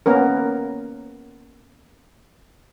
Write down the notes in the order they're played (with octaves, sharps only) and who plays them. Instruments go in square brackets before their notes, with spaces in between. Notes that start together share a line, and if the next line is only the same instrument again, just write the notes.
[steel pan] A#3 B3 C#4 A#4